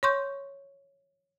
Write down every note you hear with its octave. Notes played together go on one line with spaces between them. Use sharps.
C#5 C6 C#6 G6